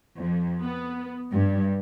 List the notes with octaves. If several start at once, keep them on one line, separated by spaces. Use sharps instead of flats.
F2
B3
G2